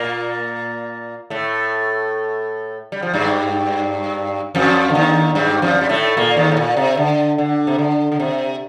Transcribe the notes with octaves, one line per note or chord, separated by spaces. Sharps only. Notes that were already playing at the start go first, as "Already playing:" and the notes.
Already playing: A#2 A#3
A2 A3
G3
F3
G2 G3
F2 F3
D3
D#2 D#3
G2 G3
F2 F3
G3
A2 A3
A#2 A#3
D#2 D#3
A2
A#2
C3
D3
D3
C3
D3
D3
C3